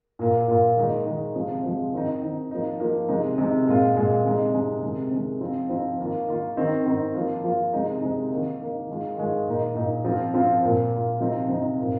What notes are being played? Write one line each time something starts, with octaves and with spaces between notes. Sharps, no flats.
A#2 A#3 F4
A#2 A#3 F4
D#3 G#3 D#4
D#3 G#3 D#4
C3 F3 G#3
C3 F3 G#3
D#3 C4 D#4
D#3 C4 D#4
F3 A#3 D#4
F3 A#3 D#4
C3 G#3 D#4
C3 G#3 D#4
A#2 G#3 F4
A#2 G#3 F4
C3 G#3 D#4
C3 G#3 D#4
C3 D#3 G#3
C3 D#3 G#3
F3 C4 D#4
F3 C4 D#4
D#3 A#3 F4
D#3 A#3 F4
D#3 C4 D#4
D#3 C4 D#4
F3 A#3 F4
F3 A#3 F4
C3 G#3 D#4
C3 G#3 D#4
D#3 A#3 D#4
D#3 A#3 D#4
D#3 G#3 F4
D#3 G#3 F4
A#2 A#3 D#4
A#2 A#3 D#4
F3 C4 F4
F3 C4 F4
A#2 A#3 F4
A#2 A#3 F4
C3 F3 C4 D#4
C3 F3 C4 D#4
A#2 A#3 F4